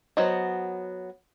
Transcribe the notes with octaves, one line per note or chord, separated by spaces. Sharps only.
F#3 B3 C5 D#5